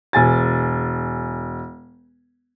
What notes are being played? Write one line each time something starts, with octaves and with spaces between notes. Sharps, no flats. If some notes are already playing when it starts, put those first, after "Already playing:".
E1 G#5 A6